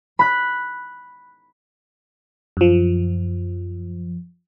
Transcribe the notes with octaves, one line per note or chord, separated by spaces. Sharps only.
B5 F#6
F#2 F3